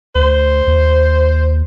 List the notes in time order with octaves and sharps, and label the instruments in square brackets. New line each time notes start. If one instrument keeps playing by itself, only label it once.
[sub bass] D2 [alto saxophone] C5
[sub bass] D#2